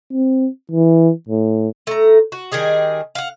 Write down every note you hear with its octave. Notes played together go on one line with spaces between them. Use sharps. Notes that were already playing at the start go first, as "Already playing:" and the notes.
C4
E3
A2
A3 A#5
F#4
D#3 G3 G#4 D#5
F5 F#5